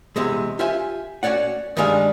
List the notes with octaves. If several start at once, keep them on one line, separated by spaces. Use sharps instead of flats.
E2 C3 G#3
F4 G4 E5 G#5
C#4 F#4 C#5 D5 F#5
G2 D#3 G3 G#3 F5 G#5